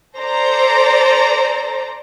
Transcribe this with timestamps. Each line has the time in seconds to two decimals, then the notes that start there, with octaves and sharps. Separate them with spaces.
0.17 A4 C5 D5 A#5